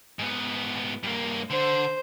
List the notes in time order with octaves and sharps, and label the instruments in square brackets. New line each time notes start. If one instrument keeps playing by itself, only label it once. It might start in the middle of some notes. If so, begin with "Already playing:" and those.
[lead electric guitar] G#2 B3
G2 A#3
[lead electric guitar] D3 [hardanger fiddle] C5